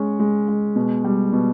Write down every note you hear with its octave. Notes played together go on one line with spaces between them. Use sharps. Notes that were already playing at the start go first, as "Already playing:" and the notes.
Already playing: G#3 C#4
G#3
G#3
B2
G3
B2